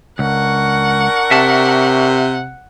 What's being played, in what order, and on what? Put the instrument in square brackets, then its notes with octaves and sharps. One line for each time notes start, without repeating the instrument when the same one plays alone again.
[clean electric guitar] C#2 [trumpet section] D4 A#4 C#6 [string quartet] F#5
[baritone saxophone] C3 [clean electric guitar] E5 A5